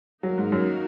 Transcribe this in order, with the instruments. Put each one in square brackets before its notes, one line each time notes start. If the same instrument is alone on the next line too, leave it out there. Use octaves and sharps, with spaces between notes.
[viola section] D#3 A#3 D#4 F#4 A#4 [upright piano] F#3
[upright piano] G#2
F#2